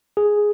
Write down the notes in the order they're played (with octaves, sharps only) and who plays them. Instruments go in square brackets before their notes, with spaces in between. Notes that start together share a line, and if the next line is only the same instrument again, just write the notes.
[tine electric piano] G#4